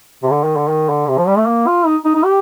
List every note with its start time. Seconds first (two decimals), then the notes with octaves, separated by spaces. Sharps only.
0.23 C3
0.31 D3
0.44 D#3
0.56 D3
0.69 D#3
0.89 D3
1.08 C3
1.18 F3
1.28 G3
1.37 A3
1.47 A#3
1.67 F4
1.86 D#4
2.05 D#4
2.15 D#4
2.25 G4